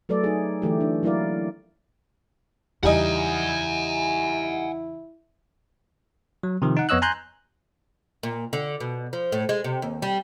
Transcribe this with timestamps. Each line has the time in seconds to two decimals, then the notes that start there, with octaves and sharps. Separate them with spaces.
0.09 F#3 A3 A4 B4 D5
0.24 D#4 G#4
0.62 D3 E3 A3 G4
0.81 D4
1.03 F#3 A#3 E4 A#4 D5 F5
2.83 E2 C#3 G3 D#4 E4 D#5 F#5 G#5
6.43 F#3
6.62 C3 D#3 F3
6.77 D#4 F#5
6.89 F2 B3 C#5 D#5 E6 F#6
7.02 G#5 A#5 C6 F#6 G6
8.23 A#2
8.53 D3
8.80 B2
9.13 F3
9.32 A2
9.49 G#3
9.64 C3
9.82 D#2
10.02 G3